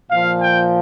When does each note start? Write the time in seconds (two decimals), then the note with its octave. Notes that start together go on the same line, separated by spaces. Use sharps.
0.11 A#2 F3 F5
0.41 G5